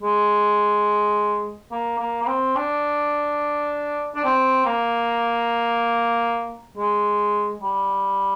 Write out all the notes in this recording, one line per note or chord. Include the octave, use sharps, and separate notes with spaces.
G#3
A#3
A#3
A#3
C4
D4
D4
C4
A#3
G#3
G3